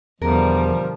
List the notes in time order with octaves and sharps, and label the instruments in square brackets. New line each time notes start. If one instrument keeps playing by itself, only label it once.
[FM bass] E2 [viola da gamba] B2 D3 G3 [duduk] F3 [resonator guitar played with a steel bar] A#4